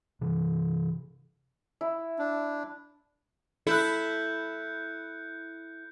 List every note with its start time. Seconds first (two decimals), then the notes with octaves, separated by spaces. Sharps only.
0.21 C3 E3
1.81 E4
2.18 D4
3.67 E4 A4 F#6 G6 C#7